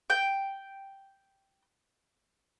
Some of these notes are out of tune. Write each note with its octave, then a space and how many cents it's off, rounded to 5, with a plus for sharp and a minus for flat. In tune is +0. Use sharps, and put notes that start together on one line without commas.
G5 +0